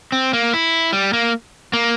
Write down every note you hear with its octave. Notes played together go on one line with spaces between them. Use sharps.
C4
A#3
E4
G3
A#3
A#3